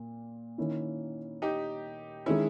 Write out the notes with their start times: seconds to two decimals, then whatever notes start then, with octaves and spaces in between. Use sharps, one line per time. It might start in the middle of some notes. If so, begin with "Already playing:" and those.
Already playing: A#2
0.58 D#3 A#3 C#4 E4
1.42 D#4 G4
2.26 D#3 G#3 C#4 E4